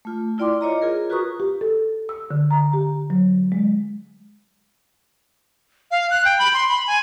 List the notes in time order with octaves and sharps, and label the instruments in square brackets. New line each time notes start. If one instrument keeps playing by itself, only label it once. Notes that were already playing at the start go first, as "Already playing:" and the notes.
[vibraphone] A3 F4
E4 F4 D5 G5 C6 D6
F4 C#5 D#5 A#5
F4 G#4 A#4
F4 F#4 B4 A#5 C#6 D#6
[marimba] G4
A4
E6
D3
A#5
G4
F#3
G#3
[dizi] F5
F#6
G5
B5
C6
B5
G#5